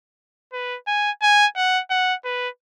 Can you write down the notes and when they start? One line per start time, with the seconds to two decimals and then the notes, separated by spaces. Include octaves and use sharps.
0.53 B4
0.87 G#5
1.22 G#5
1.56 F#5
1.90 F#5
2.25 B4